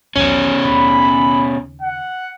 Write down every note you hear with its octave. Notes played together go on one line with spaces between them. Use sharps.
B1 E2 B2 C#4
D#2 C#3 B5
F#5